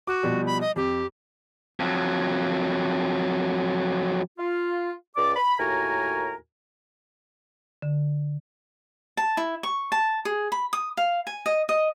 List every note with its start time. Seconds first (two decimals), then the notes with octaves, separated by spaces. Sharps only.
0.07 F#4 D6
0.23 B2 F3 G3
0.46 B5
0.61 D#5
0.76 F2 G4
1.80 F2 F#3
4.39 F4
5.16 C#2 D5 D6
5.36 B5
5.58 D#2 A2 F#4 A#4 G#5 A#5
7.82 D3
9.17 A5
9.37 E4
9.63 C#6
9.92 A5
10.25 G#4
10.52 B5
10.73 D#6
10.97 F5
11.27 G#5
11.46 D#5
11.69 D#5